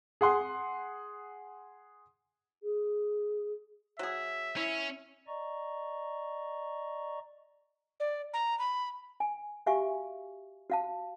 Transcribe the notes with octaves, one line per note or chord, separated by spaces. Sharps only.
G#4 F#5 C6
G#4
F#3 G#4 E5
C#4 E4
D5 D#5 A#5 C#6
D5
A#5
B5
G#5
F#4 G4 E5 F5 G#5 C#6
F#4 F5 A5